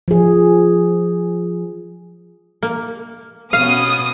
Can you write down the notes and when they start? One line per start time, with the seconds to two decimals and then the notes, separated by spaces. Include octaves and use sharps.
0.08 F3 G#4
2.63 A#3
3.53 B2 B3 C#4 F5 D#6